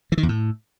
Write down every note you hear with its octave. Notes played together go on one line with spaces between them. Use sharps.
E3
D#3
E2
A2